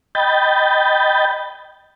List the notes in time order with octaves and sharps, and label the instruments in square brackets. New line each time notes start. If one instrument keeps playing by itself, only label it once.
[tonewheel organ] D#5 G5 B5 G6 A6